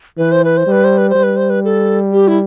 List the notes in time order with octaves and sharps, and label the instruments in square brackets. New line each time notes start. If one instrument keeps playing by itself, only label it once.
[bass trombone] E3 [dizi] B4
[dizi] C5
B4
C5
[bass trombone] G3 [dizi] B4
[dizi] C5
B4
C5
[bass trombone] G3
[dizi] B4
C5
B4
A4
G4
E4